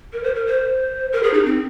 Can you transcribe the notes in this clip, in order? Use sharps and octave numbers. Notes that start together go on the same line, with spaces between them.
A#4
C5
A#4
C5
A#4
G#4
D#4
C4